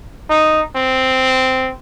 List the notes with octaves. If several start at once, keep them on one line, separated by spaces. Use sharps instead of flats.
D#4
C4